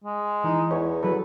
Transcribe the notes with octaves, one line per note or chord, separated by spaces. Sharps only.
G#3
E3 D#4
E2 C#5
F#3 A4 B4